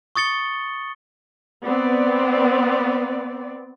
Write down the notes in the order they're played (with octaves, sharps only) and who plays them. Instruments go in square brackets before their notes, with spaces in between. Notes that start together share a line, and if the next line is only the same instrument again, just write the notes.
[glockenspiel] C#6 D#6 A6 C#7 G7
[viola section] B3 C4 D5